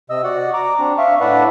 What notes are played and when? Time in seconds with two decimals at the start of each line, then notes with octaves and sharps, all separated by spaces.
0.10 C3 D#5 E6
0.24 F#4 D5 F#5
0.54 A#5 D6
0.79 C4 D4
0.98 E5 F5 C#6
1.21 A2 D4 B4 D5 E5 F#5